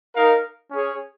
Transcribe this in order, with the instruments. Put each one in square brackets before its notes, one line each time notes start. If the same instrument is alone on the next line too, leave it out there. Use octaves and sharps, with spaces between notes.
[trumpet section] D#4 A#4 F5
C#4 G#4 C#5